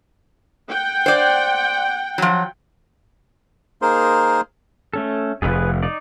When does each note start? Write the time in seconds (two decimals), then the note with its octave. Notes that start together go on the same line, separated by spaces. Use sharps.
0.70 F#5 G5
1.06 C5 D5
2.18 F3 F#3
3.82 A#3 D#4 G#4 A#4 C5 C6
4.94 A3 C#4 A4
5.42 F1 F2 G#4 B4
5.83 D#4 D5